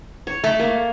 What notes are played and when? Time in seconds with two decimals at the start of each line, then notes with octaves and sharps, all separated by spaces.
0.27 C#5
0.44 A3 A4
0.59 A#3